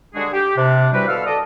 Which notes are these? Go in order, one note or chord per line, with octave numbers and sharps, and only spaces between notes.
D3 G3 G#3 D4 F#4 G#4
G4
C3 D4
C3 E3 G3 F#4 G4 B4
B2 D3 A4 F5 E6 F6
A4 D5 D#5